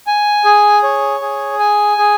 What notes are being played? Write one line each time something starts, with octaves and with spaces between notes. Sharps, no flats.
G#5
G#4
C#5
G#4
G#5
G#4